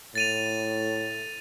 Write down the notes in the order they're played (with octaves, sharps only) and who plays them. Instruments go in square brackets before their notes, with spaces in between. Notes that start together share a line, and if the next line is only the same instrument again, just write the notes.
[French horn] A2 [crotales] A6 D#7 F7